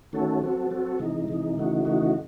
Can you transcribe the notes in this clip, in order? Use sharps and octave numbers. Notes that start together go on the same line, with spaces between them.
D#3 A3 C#4 F#4 A4
F#3 C4 F#4 A4
F#3 C4 F#4 A4
C3 E3 G#3 D#4
C3 E3 G#3 D#4
C#3 E3 A3 D#4 F#4
C#3 E3 A3 D#4 F#4